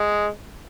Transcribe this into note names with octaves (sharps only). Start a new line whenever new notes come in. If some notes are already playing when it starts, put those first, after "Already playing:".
Already playing: G#3